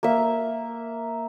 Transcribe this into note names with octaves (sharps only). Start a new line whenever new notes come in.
A#3 E5